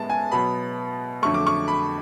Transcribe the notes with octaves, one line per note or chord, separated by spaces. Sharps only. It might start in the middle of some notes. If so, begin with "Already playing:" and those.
Already playing: A2 G#3 B3 A5
G#5
B2 F#3 B3 B5
F2 D3 F#3 A3 C#6
D6
C#6
B5